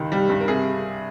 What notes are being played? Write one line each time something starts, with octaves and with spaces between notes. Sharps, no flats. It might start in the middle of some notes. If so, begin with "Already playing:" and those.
Already playing: C#2 D#3
G3
G2
A#4
C3 G#4